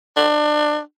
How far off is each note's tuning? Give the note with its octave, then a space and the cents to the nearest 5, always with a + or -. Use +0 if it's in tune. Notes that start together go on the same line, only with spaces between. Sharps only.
D4 +25